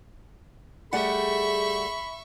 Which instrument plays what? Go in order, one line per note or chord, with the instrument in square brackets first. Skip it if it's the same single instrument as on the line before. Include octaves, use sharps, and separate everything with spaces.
[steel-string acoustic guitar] G3 A3 F#5 [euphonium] G#4 [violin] E5 C#6 [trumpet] B5